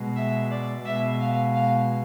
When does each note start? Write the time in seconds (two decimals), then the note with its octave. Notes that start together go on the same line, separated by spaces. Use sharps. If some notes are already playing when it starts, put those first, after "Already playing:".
Already playing: B2 G#3
0.15 E5
0.51 D5
0.85 B2 G#3 E5
1.20 F5
1.54 F5